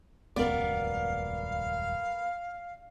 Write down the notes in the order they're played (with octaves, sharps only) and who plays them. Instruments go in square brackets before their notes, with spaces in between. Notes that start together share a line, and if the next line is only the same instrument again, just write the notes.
[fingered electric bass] D#1 C#2 F#2 [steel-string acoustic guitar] B3 A#4 [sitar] D5 [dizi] F5